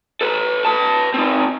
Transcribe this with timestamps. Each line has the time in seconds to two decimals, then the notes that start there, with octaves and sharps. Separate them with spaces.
0.21 A4 B4
0.65 B4 A5
1.14 C4 D#4